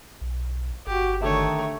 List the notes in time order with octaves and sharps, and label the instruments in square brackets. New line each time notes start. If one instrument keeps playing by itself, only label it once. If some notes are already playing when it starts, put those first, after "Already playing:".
[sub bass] B1
[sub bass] G1 [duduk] F#4 [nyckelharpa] G4
[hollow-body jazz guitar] D3 E5 [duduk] D#3 [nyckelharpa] A3 C#5